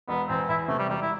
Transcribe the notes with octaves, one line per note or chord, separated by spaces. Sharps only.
E1 B3
E2 C4
E2 E4
C3 A3
G3
E1 G3
E4